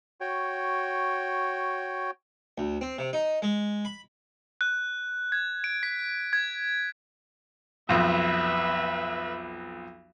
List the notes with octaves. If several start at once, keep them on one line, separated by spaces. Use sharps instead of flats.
F#4 C#5 G5
D2
C4
C3
D#4
G#3
B5
F#6
G#6
D7
B6
G#6
B1 F2 B4 E5